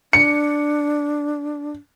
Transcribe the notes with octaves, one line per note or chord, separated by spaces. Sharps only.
D4 C#7